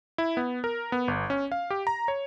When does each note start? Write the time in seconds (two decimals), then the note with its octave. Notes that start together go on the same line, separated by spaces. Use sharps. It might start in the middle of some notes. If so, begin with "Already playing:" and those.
0.18 E4
0.37 B3
0.64 A#4
0.92 B3
1.08 G1
1.30 C#4
1.52 F5
1.70 G4
1.87 A#5
2.08 C#5